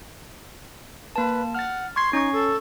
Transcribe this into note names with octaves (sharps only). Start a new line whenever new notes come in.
A#3 B4 A5
F#5 F6 A6
C6 C#6 G#6 C7
C#4 D#4 C#6
A4